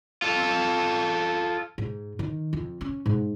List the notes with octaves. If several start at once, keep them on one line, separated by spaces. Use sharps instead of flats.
F4 A4
G#2
D#3
F2
C#4
G#2